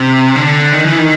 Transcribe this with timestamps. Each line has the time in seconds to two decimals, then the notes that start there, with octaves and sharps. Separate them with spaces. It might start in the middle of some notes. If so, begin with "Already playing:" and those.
Already playing: C3
0.35 D3
0.72 D#3
0.86 E3
0.98 D#3